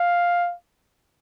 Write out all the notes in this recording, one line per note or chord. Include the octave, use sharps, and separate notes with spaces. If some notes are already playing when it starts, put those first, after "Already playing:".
Already playing: F5